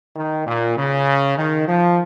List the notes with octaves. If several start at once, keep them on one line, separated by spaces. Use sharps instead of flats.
D#3
A#2
C#3
D#3
F3